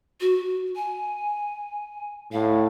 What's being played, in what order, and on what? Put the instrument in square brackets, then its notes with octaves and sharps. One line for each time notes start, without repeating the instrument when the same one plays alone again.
[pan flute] F#4
G#5
[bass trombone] A2 [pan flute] F5